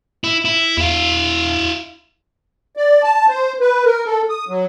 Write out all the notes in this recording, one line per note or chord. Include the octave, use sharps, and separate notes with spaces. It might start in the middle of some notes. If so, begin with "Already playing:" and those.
E4
E4
E2 E4 F5
D5
A5
C5
B4
A#4
A4
D#6
F#3